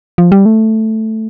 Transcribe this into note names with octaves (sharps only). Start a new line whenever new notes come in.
F3
G3
A3